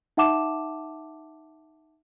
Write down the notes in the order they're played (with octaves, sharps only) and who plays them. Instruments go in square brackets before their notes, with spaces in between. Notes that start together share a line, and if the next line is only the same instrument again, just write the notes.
[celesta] D#4 E5 F#5 A5 D6 E7